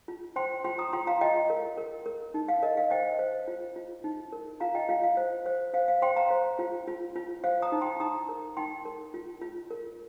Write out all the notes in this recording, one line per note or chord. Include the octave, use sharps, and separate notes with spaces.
F4
C5 G5 C6
F4 G5 C6
A#5 D#6
F4 G5 C6
F5 A#5
F4 D#5 G5
A#4
A#4
A#4
D#4
F5
A#4 D#5
F5
C5 D#5 G5
C5
F4
F4
D#4
A#4
F4 F5 A#5
D#5 G5
F4 F5
F5
C5
C5
C5 F5
F5
C5 G5 C6
F5 A#5
C5
F4
F4
F4
C5 F5
A#5 D#6
D#4
G5 C6
D#4 A#5 D#6
A#4
D#4 G5 C6
A#4
F4
F4
A#4